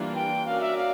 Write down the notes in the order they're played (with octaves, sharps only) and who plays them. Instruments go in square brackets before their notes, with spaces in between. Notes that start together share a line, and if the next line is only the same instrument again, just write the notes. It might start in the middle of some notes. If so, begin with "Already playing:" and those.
Already playing: [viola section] E3 G3 A#3 D4 F4
[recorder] G5
[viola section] C#4 F#4 A#4 D5 [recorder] F5
[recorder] E5
F5